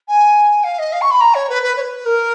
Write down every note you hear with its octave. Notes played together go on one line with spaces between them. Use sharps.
G#5
F5
D#5
F5
C#6
B5
A#5
C#5
B4
B4
C#5
B4
A#4